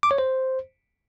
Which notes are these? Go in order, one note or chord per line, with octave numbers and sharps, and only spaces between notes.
D6
C#5
C5